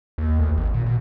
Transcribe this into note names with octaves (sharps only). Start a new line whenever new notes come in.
D#2
D2
G#1
A#2
B2